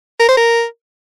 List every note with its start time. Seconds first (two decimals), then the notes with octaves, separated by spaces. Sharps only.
0.19 A#4
0.28 C5
0.37 A#4